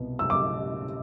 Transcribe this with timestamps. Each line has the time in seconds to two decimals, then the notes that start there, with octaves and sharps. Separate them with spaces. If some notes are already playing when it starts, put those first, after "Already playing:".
Already playing: C2 B2 B3
0.19 E6
0.30 D6